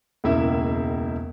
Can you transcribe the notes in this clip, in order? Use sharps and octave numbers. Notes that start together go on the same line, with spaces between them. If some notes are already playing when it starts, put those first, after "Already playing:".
E1 C#2 A#3 E4 E5